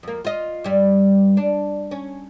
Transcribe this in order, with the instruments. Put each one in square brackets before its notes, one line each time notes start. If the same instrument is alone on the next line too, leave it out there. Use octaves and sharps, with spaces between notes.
[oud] F2 A#3
F4 D#5
G2 G3
D4
C#4